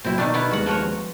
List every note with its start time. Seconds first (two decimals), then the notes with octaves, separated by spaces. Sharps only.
0.04 C2 A#2 F#3 C4 E4
0.18 B2 D#3 A3 D4
0.34 D#3 B3 E4
0.51 D#2 G3 G#3 F#4 F#5
0.66 F3 F#4 C#5